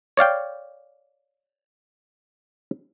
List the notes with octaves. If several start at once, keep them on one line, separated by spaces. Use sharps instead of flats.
C#5 D5 F5 G5